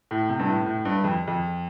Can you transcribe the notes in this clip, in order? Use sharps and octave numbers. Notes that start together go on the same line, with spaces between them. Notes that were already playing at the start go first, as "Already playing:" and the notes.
A2
C3
G2
A2
A2
G2
F2
F2